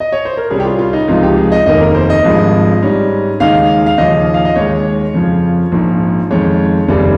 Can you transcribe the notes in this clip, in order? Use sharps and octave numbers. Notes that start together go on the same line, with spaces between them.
D#5
C#5
C5
A#4
C2 C3 G3 C#4 G#4
G4
F4
F4
D#4
C#2 C3 F3 G#3 D#4 F4
G4
G#4
D#5
F1 D#2 D#3 A#3 D#5
A#4
C5
D#5
G#1 G2 F3 G#3
G#2 G3 C#4
D#2 C#3 G#3 D#4 F5
F5
D#2 C#3 F3 D#5
F5
D#5
D#2 D#3 G#3 C#5
F2 C#3 F3
A#1 G#2 F3
F2 D#3 G#3 C#5
F1 D#2 C#3 G3